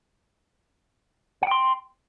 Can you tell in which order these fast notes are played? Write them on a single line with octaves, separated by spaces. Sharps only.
F#5 G5 C6